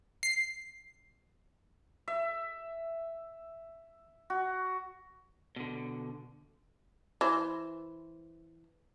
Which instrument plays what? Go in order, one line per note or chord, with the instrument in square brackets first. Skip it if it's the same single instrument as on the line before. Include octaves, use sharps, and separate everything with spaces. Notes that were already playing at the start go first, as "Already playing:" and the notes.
[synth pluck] C7
[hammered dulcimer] E5
F#4
[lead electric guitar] B2 D3
[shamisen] E3 C5